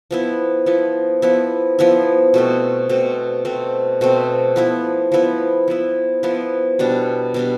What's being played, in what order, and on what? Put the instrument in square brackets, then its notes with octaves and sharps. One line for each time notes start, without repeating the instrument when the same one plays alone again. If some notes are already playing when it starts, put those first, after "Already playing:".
[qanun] F3 B3 E4
F3 B3 E4
F3 B3 E4
F3 B3 E4
B2 A3 C4
B2 A3 C4
B2 A3 C4
B2 A3 C4
F3 B3 E4
F3 B3 E4
F3 B3 E4
F3 B3 E4
B2 G3 D4
B2 G3 D4